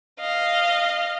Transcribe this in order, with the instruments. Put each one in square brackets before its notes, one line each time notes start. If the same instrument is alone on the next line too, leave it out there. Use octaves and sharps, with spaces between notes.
[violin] D#5 F5